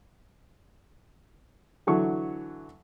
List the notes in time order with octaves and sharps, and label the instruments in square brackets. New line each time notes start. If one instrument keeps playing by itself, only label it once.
[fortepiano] D3 E3 F#3 C#6